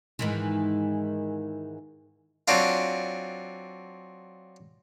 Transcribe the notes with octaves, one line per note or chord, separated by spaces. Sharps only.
G#2 D#3 E3
F#3 C4 D4 F4